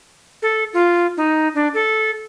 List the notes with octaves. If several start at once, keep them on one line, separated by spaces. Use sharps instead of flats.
A4
F4
D#4
D4
A4